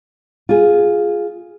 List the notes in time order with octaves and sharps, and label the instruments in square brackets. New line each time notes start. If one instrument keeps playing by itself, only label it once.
[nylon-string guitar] F4 G#4